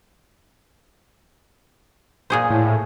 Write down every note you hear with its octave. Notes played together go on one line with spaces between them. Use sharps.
A#2 G#4 C5
A2